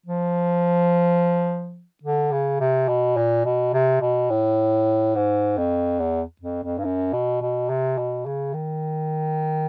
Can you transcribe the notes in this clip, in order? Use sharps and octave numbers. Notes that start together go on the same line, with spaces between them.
F3
D3
C#3
C3
B2
A#2
B2
C3
B2
A2
G#2
F2
E2
F2
F2
G2
F#2
B2
B2
C3
B2
C#3
D#3